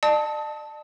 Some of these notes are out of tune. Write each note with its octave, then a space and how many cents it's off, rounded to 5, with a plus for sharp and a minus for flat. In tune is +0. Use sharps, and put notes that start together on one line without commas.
D5 +45 A5 +0 D#6 +40